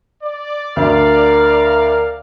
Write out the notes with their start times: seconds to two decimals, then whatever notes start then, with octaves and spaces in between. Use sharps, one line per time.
0.23 D5
0.76 D2 A#4 F5